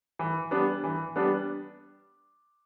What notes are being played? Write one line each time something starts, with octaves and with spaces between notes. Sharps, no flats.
E3
G3 B3 D4
E3
G3 B3 D4